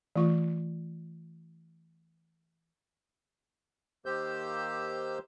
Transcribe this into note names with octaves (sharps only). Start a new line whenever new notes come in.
E3 A3 F4 C#6
D#3 A#3 G4 C5 E6 G6